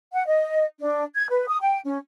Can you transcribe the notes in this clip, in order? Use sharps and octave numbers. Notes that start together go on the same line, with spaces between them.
F#5
D#5
D4
G#6
B4
D#6
G5
C#4